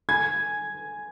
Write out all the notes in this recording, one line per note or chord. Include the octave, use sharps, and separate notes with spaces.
G#5 G#6